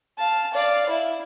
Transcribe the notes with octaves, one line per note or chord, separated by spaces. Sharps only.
F5 A5
D5 F5
E4